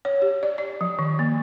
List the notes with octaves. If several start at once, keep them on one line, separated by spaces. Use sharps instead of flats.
C#5
G4
D5
D5
F3
D#3
A#3